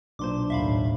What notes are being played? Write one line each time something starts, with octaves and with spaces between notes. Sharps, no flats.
B1 A#2 D4 C5 C6 D6
D#2 A2 E5 F5 B5